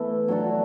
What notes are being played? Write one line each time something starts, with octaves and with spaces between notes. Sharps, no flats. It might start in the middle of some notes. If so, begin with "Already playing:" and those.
Already playing: E3 A3 B3 E4
F#3 D4 F#4 A4